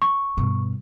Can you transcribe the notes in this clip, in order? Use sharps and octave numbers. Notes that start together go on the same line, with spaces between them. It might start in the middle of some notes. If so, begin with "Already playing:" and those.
C#6
G2 B2